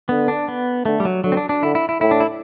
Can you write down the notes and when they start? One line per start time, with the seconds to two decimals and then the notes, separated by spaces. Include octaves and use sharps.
0.09 D3 B3
0.28 D4
0.48 B3
0.85 D3 A3
1.00 G3
1.05 F#3
1.24 D3 F#3
1.32 C4
1.37 D4
1.49 D4
1.63 D3 E4
1.75 E4
1.89 E4
2.01 A2 E4
2.11 D4
2.20 E4